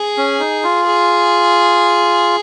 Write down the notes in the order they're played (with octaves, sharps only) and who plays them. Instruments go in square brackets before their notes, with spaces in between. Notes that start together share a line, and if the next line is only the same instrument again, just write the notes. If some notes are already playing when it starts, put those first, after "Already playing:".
Already playing: [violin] G#4
[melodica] C#4
D#4
F4
[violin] G#4